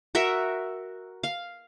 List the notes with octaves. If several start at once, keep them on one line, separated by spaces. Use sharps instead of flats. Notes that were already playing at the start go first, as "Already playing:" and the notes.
F#4 A#4 E5
F5